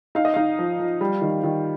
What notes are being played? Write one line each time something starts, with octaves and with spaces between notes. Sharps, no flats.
D#4 F5
D#5
D#4 F5
F3
F3
G3
D#3
D#3